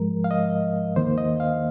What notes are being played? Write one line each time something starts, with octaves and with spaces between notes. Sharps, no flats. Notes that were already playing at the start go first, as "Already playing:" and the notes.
Already playing: G#2 F3 G#3 A#4
F5
D#5
D#2 D#3 A#3 C5
D#5
F5